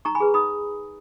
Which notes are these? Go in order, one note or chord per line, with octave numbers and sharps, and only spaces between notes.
D#4 A#5 C#6
G#5 B5
G#4 B4
D#4 B5 D#6